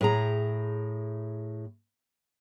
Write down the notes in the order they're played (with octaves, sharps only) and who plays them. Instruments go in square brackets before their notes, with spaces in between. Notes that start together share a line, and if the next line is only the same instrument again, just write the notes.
[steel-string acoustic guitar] A2 G#4 A#5